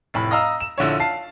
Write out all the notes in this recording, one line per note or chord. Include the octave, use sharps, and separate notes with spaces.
F1 A2 B5
D#5 F5 A#5 E6
E7
A#1 D3 E4 C#5
F5 A5 C7